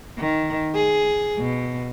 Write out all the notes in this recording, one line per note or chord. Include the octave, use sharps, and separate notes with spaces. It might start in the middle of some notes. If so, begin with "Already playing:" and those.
D#3
G#4
B2